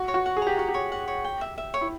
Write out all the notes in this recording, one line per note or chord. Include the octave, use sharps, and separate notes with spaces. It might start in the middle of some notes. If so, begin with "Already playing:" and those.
Already playing: F#4
C#5
F#4
F#5
G#4
G4 A#5
F#4 F#5
G4
C#5
F#5
C#5
G5
E5
E5
C#5
E4